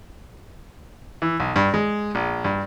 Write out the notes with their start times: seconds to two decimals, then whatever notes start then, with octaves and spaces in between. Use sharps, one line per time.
1.22 E3
1.40 B1
1.56 G2
1.74 G#3
2.15 A#1
2.44 G2